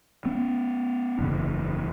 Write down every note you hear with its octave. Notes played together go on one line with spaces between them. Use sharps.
B3 C#4
F#1 E2 C#3